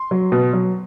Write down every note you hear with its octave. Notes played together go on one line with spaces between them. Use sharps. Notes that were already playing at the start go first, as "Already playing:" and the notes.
Already playing: C6
F#3
B2
F#3